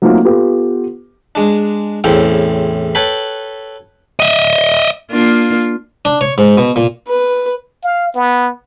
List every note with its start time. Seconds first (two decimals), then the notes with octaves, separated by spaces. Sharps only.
0.02 F#3 A3 A#3 C4 D#4 F4
0.25 B3 F4 G4 A4
1.35 G#3 D4
2.04 E2 A2 C#3 C4 E4 G5
2.95 A4 B4 C#5 G5 B5
4.20 D#5 E5
5.11 A#3 D4 F4
6.05 D4
6.21 C#5
6.38 G#2
6.57 B2
6.76 A#2
7.07 B4
7.84 F5
8.15 B3